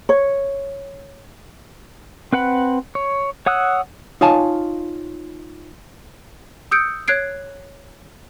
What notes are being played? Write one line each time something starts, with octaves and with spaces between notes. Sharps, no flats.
C#5
C4 B4 F#5 B5
C#5
C#5 F#5 D#6 E6 F#6
D#4 F4 C#5 F5 G#5 A5
D#6 E6 G6 C#7 D7
C#5 F#6 G#6 C7 D7